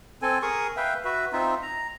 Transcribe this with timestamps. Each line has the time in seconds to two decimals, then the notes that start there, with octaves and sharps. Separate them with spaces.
0.22 C4 A4 G#5
0.42 G#4 A#4 C#6 D#6
0.77 B4 E5 F5 G5
1.05 F#4 B4 E5
1.33 C4 D#4 F4 E5
1.62 A#5